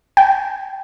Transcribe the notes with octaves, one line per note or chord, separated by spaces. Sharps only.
G5